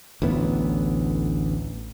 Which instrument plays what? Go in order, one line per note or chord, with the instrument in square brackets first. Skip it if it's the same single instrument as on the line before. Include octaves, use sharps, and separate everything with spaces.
[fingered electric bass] A1 D2 A2 B3